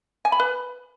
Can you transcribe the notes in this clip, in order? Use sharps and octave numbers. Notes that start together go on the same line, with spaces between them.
G#5
B5
B4